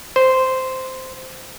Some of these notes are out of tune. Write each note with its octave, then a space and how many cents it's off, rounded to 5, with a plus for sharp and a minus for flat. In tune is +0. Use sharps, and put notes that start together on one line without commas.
C5 -10